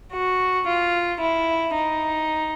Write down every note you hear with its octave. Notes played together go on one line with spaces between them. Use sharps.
F#4
F4
E4
D#4